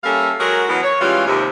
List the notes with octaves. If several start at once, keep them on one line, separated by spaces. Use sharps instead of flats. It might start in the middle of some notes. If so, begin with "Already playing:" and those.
G3 A#3 C#4 A4 E5 F5
F#3 G#3 F#4 G#4 A#4
B2 E3 F#3 B3
C#5
E3 G3 G#3 C#4 F4
D#2 C3